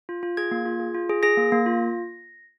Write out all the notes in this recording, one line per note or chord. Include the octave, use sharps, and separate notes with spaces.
F4
F4
G#4 G#6
A#3
F4
G#4
F4
G#4
G#4 A#6
A#3
A#3
F4